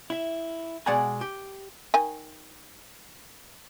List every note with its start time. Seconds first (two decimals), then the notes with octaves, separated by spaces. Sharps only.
0.10 E4 E5
0.86 B2 G#3 D5 F#5 G#5 A#5
1.21 G4
1.94 D#3 G#5